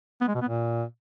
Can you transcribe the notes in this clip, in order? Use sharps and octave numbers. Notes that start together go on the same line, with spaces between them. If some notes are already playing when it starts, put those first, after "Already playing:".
B3
G#3
B2
B3
A#2